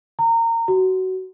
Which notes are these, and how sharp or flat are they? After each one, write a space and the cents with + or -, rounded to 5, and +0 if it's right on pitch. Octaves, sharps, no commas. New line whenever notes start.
A#5 -25
F#4 +20